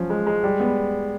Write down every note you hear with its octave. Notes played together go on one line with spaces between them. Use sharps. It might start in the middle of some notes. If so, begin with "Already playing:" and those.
Already playing: F3 F#3 C#4
G#3
G#3
G3
B3